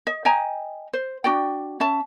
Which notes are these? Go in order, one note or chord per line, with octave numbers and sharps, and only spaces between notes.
D#5
D#5 G5 G#5 A#5
C5
D4 F#4 D5 G5
C#4 E5 A5